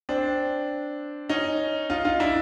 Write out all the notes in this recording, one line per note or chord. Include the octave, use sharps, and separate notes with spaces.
C4 D4
C#4 D#4
D#4 F4
D#4 F4
D4 E4